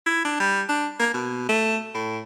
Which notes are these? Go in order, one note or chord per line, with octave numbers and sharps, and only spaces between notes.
E4
D4
G3
D4
A#3
B2
A3
A2